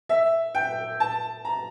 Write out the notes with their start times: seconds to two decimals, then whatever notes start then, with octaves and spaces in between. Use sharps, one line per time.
0.09 E5
0.55 G5
1.00 A5
1.45 A#5